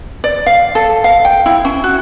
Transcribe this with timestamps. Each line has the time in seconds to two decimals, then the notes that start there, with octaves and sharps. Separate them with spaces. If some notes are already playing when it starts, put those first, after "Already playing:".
0.24 D5
0.46 F5
0.75 A4
1.04 F5
1.25 G5
1.46 E4
1.65 C#4
1.84 F#4